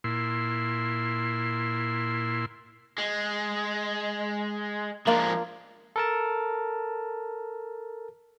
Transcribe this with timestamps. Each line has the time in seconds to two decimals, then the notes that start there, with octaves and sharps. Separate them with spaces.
0.04 A#2 E4 C6
2.98 G#3
5.07 F3 G#3 A#3 D4 F4
5.96 A4 A#4 A5